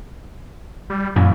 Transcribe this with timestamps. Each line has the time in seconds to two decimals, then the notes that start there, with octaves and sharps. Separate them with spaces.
0.90 G3
1.16 F#2 A#2 E3